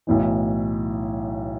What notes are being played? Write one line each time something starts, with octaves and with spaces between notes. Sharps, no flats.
B1 A2 E3